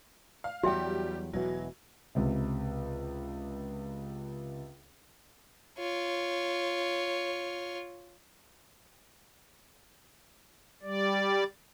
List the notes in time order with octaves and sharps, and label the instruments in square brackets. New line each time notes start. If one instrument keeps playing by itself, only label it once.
[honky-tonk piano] F5
[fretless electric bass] E2 F#3 [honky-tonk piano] G3 G4 [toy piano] F#4 E5 G5
[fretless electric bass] E1 B2 E3 [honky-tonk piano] F#3
[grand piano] C#2 C3
[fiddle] F4 C#5
[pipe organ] G3 D5